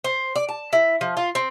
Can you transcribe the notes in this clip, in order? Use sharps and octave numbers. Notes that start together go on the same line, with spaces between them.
C5
D5
A5
E4
F3
F4
C4